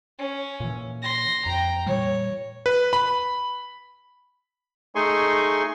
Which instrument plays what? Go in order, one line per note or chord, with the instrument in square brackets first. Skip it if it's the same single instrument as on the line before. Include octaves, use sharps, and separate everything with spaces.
[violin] C#4
[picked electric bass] A#2 E3
[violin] C6 A#6
[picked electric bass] F2 [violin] G5 A#5
[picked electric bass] A#2 E3 G3 [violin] C#5
[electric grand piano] B4
B5
[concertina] A3 D#4 G#4 G#5 C6 C#6